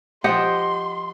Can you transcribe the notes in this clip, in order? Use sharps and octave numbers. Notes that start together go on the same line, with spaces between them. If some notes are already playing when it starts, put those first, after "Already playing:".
F3 G4 C5 D#5 F#5 C6